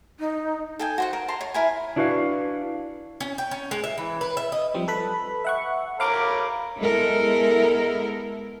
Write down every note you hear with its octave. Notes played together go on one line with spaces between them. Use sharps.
D#4
A4 G5 G#5
F#4 C5 F#5
A#4
A5 A#5 C6
C#5
E4 A#4 G#5
D4 E4 F#4 B4 C#5 F5
C#4
G5
C#4
G#3
E5
E3
B4
E5
D#5
F3 G3 C4
A4 B4 B5
E5 F#5 C#6
A#4 C#5 F5 B5 D6
G#3 B3 E4 A4 A#4